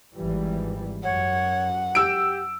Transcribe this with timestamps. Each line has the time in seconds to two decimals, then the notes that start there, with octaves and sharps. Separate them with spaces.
0.16 G#1 E3 G3
1.03 F#2 C#5 F#5
1.95 G4 E6 D7